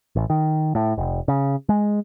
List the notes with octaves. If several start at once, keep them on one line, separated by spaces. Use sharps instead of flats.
A1
D#3
A2
F1
C#3
G#3